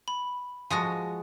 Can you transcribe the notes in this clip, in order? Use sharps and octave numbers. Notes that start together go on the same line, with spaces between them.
B5
F3 G#3 F#4 G#5 D#6 A#6